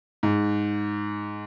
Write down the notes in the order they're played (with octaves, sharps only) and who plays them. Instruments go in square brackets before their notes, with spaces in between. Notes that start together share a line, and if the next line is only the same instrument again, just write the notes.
[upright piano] G#2